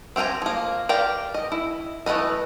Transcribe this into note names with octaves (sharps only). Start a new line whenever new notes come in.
C4 G4 F5 G#5 A#5
F3 A#3
G4 A#4 D5 F5 G5
D#5
E4
E3 A3 A#3 B4 D#5